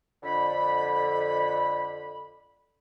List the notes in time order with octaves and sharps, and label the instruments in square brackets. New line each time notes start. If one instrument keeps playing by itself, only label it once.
[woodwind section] F2 D3 B5